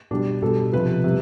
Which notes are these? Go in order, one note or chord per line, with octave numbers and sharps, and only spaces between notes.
B2 G3 D4
B2 G3 A4
C3 F3 B4
C3 G3